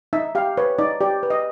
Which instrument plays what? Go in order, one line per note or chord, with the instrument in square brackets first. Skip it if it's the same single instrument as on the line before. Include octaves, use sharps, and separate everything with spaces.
[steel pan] D#4 E5
G4 F5
B4 C#5
D#4 D5
G4 D5
B4
D#5